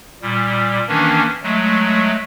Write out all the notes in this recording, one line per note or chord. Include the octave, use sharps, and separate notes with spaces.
A#2 G3
D#3 E3 A#3 C#4 D4
F#3 G#3 A3